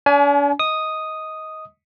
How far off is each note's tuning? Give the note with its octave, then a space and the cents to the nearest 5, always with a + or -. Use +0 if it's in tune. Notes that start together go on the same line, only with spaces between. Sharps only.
D4 -45 G#5 +30
D#5 +20 D#6 +0